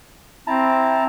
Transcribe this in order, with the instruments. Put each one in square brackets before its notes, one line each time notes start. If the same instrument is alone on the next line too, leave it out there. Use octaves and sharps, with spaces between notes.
[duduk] C4 [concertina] E4 A5 A#5